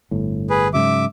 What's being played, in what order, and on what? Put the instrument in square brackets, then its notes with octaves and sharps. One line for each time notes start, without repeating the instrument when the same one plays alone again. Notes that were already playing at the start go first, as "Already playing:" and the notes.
[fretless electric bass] G1 A2
[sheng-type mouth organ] G#4 B4
[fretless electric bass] G#2 C#3 F#3 [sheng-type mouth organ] E5 D6